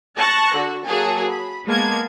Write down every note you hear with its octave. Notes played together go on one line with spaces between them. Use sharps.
A5 C#6 F#6 A#6
D3 F#4
F#3 A#3 G#4 A4
B5
G#3 A#3 B3 A5 G#6